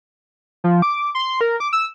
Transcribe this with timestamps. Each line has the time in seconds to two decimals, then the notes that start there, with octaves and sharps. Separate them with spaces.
0.64 F3
0.82 D6
1.15 C6
1.41 A#4
1.60 D6
1.73 E6